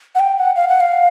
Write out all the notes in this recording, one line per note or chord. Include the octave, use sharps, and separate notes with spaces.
F#5
G5
F#5
F5
F#5
F5